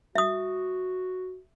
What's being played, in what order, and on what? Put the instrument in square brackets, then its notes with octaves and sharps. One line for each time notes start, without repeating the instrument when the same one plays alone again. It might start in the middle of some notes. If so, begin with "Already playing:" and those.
[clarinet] F#4 [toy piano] E5 D#6